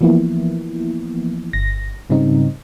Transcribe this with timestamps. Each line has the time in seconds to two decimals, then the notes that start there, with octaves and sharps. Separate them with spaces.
0.01 E3 F3 A#3 B3 E4
1.53 G1 A#6
2.10 G#2 C#3 G3 C4 D#4